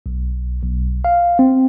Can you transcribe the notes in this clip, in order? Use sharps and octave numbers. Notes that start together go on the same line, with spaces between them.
B1
B1
F5
C4